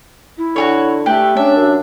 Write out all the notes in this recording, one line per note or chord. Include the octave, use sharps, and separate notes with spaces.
E4
D3 F#4 G#4 C#5
A3 G4 B4
C#4 D4 E5
F#2